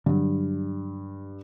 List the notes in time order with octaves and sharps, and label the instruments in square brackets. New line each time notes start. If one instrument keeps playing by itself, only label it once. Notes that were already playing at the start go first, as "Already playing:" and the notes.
[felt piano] G2 [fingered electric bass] D3 F#3